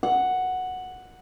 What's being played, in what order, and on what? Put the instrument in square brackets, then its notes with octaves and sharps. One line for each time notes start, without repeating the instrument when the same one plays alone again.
[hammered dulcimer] F#5